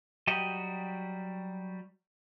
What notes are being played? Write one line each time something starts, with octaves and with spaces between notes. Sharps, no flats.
F#3 G3 F#4 G4 D#5